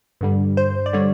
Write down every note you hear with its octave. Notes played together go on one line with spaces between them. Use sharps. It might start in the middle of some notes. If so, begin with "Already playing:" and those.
G2 D3 G3
C5
D5
D3 G3 C#5